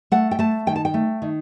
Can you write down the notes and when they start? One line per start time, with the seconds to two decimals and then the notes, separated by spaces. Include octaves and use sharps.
0.12 A3 F#5
0.31 G5
0.39 A3 A5
0.67 D#3 G5
0.76 A5
0.85 G5
0.94 A3
1.22 D#3